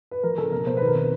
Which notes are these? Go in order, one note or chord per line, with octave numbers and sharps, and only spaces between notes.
B4
F3 A#4
C#3 A4
B2 A#4
B2 C5
D#3 B4
A#4
C4 B4